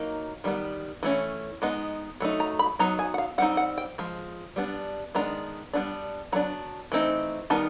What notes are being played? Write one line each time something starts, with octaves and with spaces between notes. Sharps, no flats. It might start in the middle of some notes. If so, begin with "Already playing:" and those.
Already playing: F#3 A#3 D#4
D#3 G3 B3
E3 A3 C#4
G#3 B3 D#4
F#3 A3 D#4
A#5
B5
F#3 B3 D#4 A#5
G#5
F#5
F5
G3 C4 D#4 F#5
F#5
G5
F3 G#3
G3 B3 D4
D#3 G#3 B3 D4 A#5
G3 B3 D4
F#3 B3 D4 A#5
E3 A3 C4 D#4
D#3 G3 B3 D#4 A5